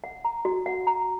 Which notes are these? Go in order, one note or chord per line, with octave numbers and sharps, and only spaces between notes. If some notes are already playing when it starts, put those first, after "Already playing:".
F#5
A#5
F#4
F#5
A#5